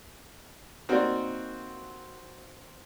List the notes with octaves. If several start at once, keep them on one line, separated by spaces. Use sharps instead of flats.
A#3 C4 D#4 F#4 D5